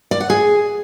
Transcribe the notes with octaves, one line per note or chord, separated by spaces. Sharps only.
D5
F#5
G#4